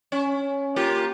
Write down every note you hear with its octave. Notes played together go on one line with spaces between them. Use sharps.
C#4
A#3 F4 G4